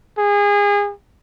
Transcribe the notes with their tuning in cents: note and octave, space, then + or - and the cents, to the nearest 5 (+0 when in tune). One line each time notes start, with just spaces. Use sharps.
G#4 -30